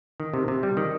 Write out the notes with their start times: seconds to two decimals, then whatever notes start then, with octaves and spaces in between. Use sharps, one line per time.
0.20 D#3
0.34 C3
0.48 C3
0.63 G3
0.77 D#3